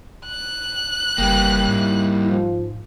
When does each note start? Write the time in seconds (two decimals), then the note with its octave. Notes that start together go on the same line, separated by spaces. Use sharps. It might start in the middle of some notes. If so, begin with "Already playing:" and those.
0.27 F#6
1.18 F#1 C2 E3 G3 A#3 G5
1.68 G#2 E4
2.28 F3